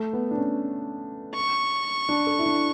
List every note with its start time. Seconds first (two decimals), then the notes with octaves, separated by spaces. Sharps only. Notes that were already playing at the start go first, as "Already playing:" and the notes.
Already playing: A3
0.13 B3
0.31 D4
0.38 C#4
1.35 C#6
2.09 D4
2.27 A4
2.39 E4
2.46 D4